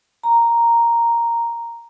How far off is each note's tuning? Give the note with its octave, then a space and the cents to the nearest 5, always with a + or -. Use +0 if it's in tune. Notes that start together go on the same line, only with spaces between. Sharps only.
A#5 +0